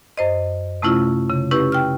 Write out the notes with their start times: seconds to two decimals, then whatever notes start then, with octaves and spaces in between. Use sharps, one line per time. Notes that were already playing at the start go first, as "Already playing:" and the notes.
0.18 F#2 C5 D#5
0.82 C3 A3 C#4 E4 F4
1.30 C#3
1.51 C#4 E4 G4 B4
1.72 G5 F6